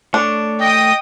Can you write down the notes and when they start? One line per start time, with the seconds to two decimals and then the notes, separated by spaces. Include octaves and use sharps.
0.14 A3 D4 C#5
0.61 D#5 G5 D#6